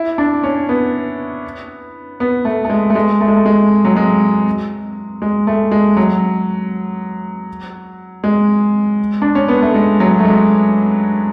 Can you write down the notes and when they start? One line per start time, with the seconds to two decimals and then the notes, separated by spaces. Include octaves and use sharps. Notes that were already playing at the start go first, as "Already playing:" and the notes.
Already playing: E4
0.18 D4
0.43 C#4
0.69 B3
2.20 B3
2.45 A3
2.65 A3
2.70 G#3
2.90 A3
2.95 G#3
3.21 A3
3.28 G#3
3.36 A3
3.46 G#3
3.85 F#3
3.96 G#3
5.22 G#3
5.47 A3
5.72 G#3
5.97 F#3
8.24 G#3
9.22 D4
9.35 C#4
9.48 B3
9.62 A3
9.75 G#3
10.00 F#3
10.19 A3
10.25 G#3